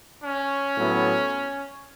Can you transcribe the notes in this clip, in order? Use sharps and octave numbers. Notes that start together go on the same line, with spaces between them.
C#4
A2 F#3 B3